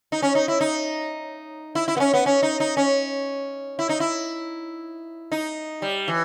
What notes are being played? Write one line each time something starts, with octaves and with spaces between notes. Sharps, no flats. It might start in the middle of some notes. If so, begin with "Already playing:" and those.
D#4
C#4
D#4
E4
D#4
E4
E4
B3
C#4
B3
C#4
D#4
D#4
C#4
E4
D#4
E4
D#4
G3
E3